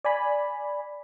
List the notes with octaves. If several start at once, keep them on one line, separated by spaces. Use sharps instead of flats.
D5 G#5 B5